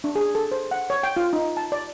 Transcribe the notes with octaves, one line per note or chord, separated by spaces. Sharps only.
D4
G#4
A4
C5
F#5
C#5
G5
F4
D#4
A5
D5